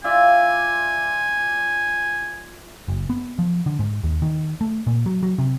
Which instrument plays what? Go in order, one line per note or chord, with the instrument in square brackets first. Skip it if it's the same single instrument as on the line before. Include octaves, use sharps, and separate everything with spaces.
[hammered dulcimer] F4 D5 E5 [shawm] G#5
[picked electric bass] F#1
B3
F3
D3
G#2
D#2
D#3
A3
A#2
F#3
F#3
C3